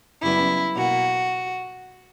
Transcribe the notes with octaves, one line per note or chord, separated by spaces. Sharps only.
F#2 C#3 G3 B3 E4
B2 A#3 F#4